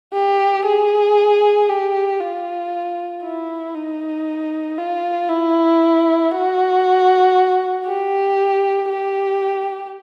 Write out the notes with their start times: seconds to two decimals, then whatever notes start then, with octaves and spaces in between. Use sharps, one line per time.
0.14 G4
0.66 G#4
1.69 G4
2.21 F4
3.23 E4
3.75 D#4
4.78 F4
5.29 E4
6.32 F#4
7.86 G4
8.90 G4